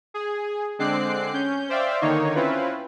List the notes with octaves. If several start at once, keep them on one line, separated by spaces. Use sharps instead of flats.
G#4
D3 G#3 C4 D6 F#6 C7
C#4 G6
C5 D5 E5 F5 G5
D3 D#3 A#3 D#4 C#5
C4 C#4 E4 F4 B4